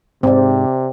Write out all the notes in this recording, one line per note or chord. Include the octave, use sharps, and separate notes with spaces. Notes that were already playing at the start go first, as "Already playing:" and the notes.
G#2 C3 C4 D5